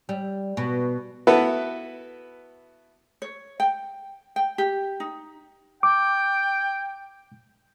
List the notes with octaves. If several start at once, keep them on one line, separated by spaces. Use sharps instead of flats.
G3
B2
B3 E4 F#4 A4 B4
C#5
G5
G5
G4
D#4
G5 D6